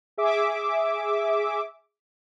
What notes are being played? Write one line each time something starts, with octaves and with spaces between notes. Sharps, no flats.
G#4 E5 D6